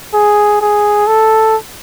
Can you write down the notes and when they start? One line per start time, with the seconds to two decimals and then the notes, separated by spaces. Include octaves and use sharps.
0.14 G#4
0.61 G#4
1.08 A4